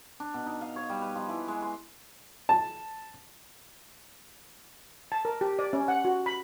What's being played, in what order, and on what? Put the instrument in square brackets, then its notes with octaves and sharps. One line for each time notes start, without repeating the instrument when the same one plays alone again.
[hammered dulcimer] D4
B2
D#4
F5
C#5
G3
B4
F3
E3
G#3
C6
[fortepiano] A5
[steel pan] A5
A#4
G4
D5
C#4
F#5
F#4
B5